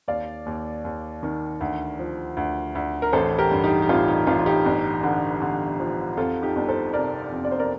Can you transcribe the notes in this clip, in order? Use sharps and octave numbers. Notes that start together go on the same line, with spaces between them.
D#2 D5 F5
D#2
D#2
D#3
D2
F3
D2
D2
A#4
A1 A4 C5
G4 A#4
G2
D#4 G4
G4
A1 F4
D#4
A1 F4
F4
D#4 G4
G1
D3
D3
F3
F2 F4 A4
D#4 G4
G1
A4 C5
C3 A#4 D5
F2
D5
C5
A#4 D5